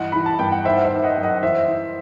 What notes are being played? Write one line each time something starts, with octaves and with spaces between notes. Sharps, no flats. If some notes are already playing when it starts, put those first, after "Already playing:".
Already playing: G2 E3 D#5 F#5
E3 B5
A5
G2 G5
F#5
D#3 C5 E5
C5 E5
D#3
D#5 F#5
F#2
D#5 F#5
E3 C5 E5
E3